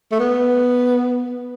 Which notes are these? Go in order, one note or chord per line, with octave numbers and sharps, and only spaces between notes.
A3
B3